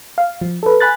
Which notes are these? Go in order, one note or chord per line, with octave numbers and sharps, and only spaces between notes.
F5
F3
A4 B4
G#5 B5 F#6 A6